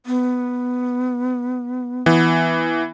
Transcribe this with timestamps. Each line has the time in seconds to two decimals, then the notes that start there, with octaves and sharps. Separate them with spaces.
0.06 B3
2.06 E3 B3